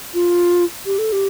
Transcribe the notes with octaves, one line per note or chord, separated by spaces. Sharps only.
F4
G4
A4
G4